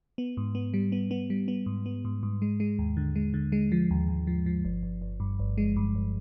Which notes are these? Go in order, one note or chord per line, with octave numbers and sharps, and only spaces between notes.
B3
G#2
B3
G3
B3
B3
G3
B3
G#2
B3
G#2
G#2
G#3
G#3
D#2
D3
G#3
D3
G#3
F3
D#2
D#2
F3
F3
G1
G1
G1
G2
G1
G#3
G2
G1